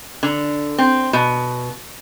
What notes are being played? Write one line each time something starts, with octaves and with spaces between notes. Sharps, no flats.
D3
C4
B2